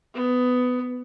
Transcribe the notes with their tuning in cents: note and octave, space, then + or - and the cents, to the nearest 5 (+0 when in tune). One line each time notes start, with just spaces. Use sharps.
B3 +15